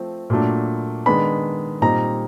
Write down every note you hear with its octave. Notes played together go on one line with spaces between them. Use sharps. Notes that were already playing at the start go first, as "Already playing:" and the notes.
Already playing: F3 A3 C4
A#2 F#3 A3 D4
D#3 G#3 B3 D4 B5
A#2 G3 C4 D#4 A#5